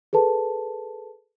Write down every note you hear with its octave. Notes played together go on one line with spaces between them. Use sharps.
G#4 A4 B4 A5